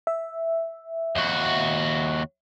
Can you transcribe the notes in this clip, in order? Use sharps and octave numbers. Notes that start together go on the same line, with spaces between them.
E5
D#2 F#4